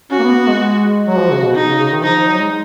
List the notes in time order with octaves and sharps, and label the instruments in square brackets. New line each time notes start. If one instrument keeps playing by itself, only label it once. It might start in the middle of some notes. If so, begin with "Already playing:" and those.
[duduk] C#4 [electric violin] F#4
[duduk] A#3
B3
B3
G#3
[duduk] F#3 [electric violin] F#4
[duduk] F3
C#3
B2
[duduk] B2 [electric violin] D#4
[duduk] C#3
C#3
D#3
[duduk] F3 [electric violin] D#4
[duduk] F3
F#3
G#3